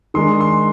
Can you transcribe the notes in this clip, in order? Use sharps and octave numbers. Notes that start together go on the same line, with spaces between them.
D#3 G#3 D4 C6
C6